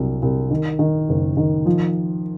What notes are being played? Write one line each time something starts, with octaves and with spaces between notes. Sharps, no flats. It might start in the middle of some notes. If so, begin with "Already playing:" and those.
Already playing: C2 F#3
C2
D#3
D#3
F#1
D#3
F3